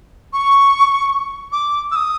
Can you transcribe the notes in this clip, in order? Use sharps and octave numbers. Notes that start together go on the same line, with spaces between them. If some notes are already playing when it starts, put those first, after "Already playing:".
C#6
D6
E6
D#6